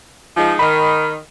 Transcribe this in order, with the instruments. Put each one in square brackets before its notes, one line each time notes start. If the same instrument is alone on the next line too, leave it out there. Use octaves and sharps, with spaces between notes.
[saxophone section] F3 G#3 D#4
[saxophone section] D#3 [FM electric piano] B5